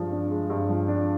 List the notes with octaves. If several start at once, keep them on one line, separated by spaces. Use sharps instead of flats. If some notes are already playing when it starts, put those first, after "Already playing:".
Already playing: G2 F3 G#3
D4
G#3
G2
F3
D4